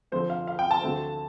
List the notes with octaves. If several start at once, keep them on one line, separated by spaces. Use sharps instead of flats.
F2 D3 F3 A3 C4 C5
F5
F5
G5
A5
D2 D3 A3 C4